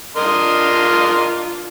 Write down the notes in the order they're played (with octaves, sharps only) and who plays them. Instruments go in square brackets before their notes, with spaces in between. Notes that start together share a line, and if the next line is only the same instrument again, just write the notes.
[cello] D4 F4 [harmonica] A#4 D#5 C6